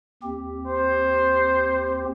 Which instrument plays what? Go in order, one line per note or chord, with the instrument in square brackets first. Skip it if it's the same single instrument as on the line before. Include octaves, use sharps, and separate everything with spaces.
[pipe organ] D#2 C4 G4
[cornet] C5